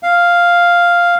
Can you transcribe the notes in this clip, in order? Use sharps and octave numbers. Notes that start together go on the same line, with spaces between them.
F5